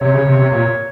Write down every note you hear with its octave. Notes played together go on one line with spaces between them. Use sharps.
C3 C#5
C#3
C3
C3
A#2